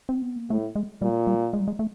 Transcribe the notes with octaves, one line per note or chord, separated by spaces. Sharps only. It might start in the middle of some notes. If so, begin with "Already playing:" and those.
C4
B3
A#3
A2 A3
G#3
A#2 G3
G3
G#3
G3
G#3
A3